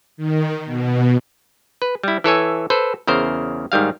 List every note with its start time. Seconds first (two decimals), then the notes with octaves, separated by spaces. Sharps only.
0.17 D#3
0.65 B2
1.82 B4
2.03 G3 E4
2.24 E3 A4 C#5 G#5
2.70 A4 B4 C5
3.07 E2 C#3 A#4 C5
3.72 G#2 D#3 G3 F5